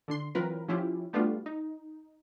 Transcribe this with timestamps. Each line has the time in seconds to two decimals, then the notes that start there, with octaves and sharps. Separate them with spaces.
0.08 D3 D4 C6
0.35 E3 F#3 C4 F4 A#4 B4
0.68 F3 C#4 E4 F4 G4
1.13 G3 A3 B3 D4 F4 F#4
1.46 D#4